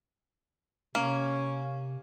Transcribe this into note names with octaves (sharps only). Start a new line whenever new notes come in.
C3 A#3 C#4